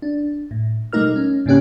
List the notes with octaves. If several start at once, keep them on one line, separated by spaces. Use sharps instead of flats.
D4
A2
B2 G3 A3 D#4 A#4 F6
C#4
G#2 C#3 A#3 C#4 G4 F#6